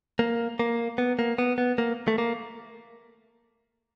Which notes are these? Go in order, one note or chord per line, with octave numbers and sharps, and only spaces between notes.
A#3
A#3
B3
A#3
B3
B3
A#3
A3
A#3